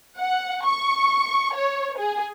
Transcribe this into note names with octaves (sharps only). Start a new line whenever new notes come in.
F#5
C#6
C#5
G#4